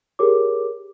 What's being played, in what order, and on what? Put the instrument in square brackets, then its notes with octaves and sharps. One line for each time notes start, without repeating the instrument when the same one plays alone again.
[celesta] G4 G#4 A#4 C#5 D6